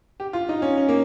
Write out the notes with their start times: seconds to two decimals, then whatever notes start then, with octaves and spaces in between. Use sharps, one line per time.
0.20 G4
0.33 F4
0.49 D#4
0.62 C#4
0.78 C#4
0.88 A#3